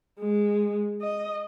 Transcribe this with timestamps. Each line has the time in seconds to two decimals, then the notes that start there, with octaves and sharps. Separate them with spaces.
0.20 G#3
1.01 D#5